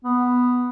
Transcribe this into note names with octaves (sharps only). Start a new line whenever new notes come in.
B3